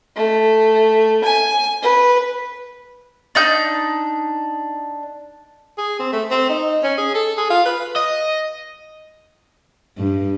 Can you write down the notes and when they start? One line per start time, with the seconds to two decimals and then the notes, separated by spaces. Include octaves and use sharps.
0.16 A3
1.24 G#5
1.82 B4
3.35 D4 D#4 G6
5.78 G#4
6.00 C4
6.13 A3
6.31 C4
6.49 D#4
6.84 C#4
6.98 G#4
7.15 A4
7.37 G#4
7.50 F4
7.66 B4
7.96 D#5
9.98 G2